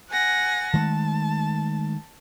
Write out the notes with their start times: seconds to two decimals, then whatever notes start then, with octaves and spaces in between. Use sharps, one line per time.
0.11 F#5 G#5 A#6
0.74 D#3 G#3 A3 A5